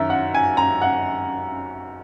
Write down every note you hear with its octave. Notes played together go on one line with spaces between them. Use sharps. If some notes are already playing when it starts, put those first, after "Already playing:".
Already playing: F#2 D#3 E5
F#5
G#5
A#5
F#5